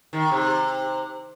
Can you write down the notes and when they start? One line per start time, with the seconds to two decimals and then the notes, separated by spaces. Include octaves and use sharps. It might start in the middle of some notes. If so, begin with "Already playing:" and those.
0.13 D#3
0.31 C3